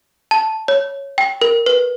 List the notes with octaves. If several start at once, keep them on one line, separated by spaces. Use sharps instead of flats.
A5
C#5
G5
A#4
B4